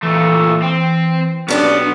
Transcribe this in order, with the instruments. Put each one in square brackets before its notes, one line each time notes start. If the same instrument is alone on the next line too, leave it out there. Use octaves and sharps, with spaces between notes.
[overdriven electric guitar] A#2 A3 [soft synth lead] E3
[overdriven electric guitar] C4
[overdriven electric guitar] B1 B3 [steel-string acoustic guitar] C#4 D4 G4